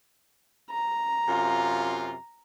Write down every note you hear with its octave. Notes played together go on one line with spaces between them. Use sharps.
A#5
F#2 C3 F4